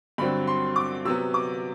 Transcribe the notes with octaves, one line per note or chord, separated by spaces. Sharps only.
G2 D3 F#3 C4 B5
C6
D6
C3 F#3 B3 E6
D6